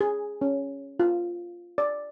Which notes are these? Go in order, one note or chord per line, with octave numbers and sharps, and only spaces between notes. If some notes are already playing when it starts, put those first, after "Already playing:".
G#4
C#4
F4
D5